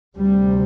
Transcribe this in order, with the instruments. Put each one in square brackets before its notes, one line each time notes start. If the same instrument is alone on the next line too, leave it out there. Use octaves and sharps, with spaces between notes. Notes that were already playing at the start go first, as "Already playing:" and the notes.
[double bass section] D2 C3 G3